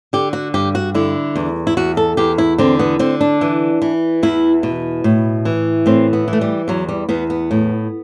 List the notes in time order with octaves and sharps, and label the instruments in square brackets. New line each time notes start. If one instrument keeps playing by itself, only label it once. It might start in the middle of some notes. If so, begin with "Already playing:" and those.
[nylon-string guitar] D3 G4
F#4
G2 G4
F#4
D3 E4
E2
E4
E2 F#4
A4
E2 G4
E4
D3 C4
B3
D3 C4
D4
E3
E3
E2 E4
B2
A2
E3
A2 C4
B3
E3
A3
G3
E2 F#3
G3
E2 B3
B3
A2